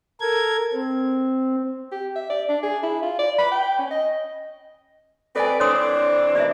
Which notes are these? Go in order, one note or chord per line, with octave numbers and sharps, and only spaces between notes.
A4 A#4 G#6
C4
G4
E5
D5
D4
G#4
E4
F4
D5
B5
G5
C#4
D#5
C4 A4 B4 D5 G#5
E3 C4 D4 C#5 C6 D#6
B2 D#3 D4 D5 E5